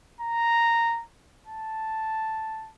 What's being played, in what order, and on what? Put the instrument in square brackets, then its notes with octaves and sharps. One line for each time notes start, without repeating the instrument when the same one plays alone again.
[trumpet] A#5
A5